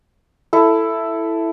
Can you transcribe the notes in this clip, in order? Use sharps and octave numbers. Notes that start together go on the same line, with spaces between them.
E4 A4